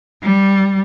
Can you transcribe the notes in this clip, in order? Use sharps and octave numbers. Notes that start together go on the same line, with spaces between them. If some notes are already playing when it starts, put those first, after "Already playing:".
G3